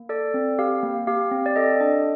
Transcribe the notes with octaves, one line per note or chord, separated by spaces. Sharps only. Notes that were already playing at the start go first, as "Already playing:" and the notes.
Already playing: A#3
A4 D5
C4
G4 F5
A#3
G4 F5
C4
D5
A4 D#5
D4 D#5